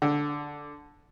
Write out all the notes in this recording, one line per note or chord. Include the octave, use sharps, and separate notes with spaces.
D3